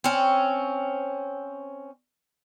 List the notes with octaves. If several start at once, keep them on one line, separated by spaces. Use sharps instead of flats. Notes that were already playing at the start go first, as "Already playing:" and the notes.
C4 C#4